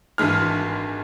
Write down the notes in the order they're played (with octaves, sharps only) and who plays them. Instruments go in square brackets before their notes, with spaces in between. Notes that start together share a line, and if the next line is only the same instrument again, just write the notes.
[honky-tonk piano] G#1 G2 E3 G#3 F6